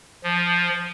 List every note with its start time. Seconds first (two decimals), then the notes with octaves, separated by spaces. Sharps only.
0.24 F3